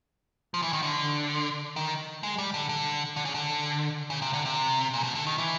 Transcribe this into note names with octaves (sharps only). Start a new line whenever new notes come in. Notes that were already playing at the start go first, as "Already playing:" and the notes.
F3
E3
D#3
D3
D#3
G#3
G3
D3
D3
D3
C#3
D3
C#3
C3
D3
C3
A#2
B2
D3
D#3
E3